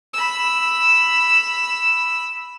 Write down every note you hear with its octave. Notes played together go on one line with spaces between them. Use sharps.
B5 E6